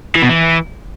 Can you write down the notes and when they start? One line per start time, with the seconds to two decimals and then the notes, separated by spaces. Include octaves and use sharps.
0.16 E3
0.22 B2
0.29 E3